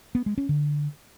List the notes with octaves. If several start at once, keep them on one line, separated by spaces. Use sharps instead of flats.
B3
G#3
C#4
D3